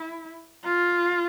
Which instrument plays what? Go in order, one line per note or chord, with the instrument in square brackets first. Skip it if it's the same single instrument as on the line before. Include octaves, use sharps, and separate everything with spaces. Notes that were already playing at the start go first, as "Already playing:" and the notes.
Already playing: [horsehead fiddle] E4
F4